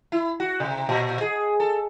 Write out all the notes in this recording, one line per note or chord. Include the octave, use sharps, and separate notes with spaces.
E4
F#4
C3
A#2
G#4
A4